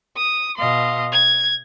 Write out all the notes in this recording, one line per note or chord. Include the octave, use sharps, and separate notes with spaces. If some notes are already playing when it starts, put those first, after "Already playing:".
D#6
B2 D#5 F5 C6
G#6